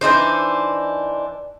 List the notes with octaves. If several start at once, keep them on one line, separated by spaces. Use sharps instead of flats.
E3 D4 D#4 C5